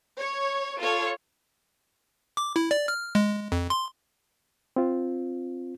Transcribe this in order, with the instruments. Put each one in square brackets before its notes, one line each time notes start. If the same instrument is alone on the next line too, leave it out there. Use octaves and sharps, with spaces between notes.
[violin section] C#5
F4 A4 C#5
[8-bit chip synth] D6
E4
D5
F6
G#3
F2
C6
[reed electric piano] C4 F4